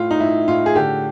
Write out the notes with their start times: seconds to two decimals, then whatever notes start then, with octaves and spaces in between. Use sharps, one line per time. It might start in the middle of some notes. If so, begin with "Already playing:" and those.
Already playing: A2 F4
0.11 D#4
0.20 A2 E4
0.48 A2 F4
0.66 G#4
0.75 D3 G4